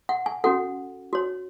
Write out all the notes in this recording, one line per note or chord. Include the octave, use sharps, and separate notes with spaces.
F#5
G#5
C#4 F#4 A4 F#5
F#4 C#5